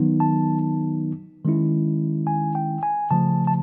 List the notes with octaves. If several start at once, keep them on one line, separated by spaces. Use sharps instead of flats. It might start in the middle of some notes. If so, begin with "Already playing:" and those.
Already playing: D#3 F#3 B3 D#4
A5
D#3 G#3 C#4 E4
G#5
G5
G#5
C#3 F3 A3 A5
A5